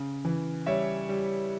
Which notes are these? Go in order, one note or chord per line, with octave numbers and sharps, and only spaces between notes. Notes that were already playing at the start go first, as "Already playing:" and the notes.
Already playing: C#3
E3
G3 C#5 E5
G3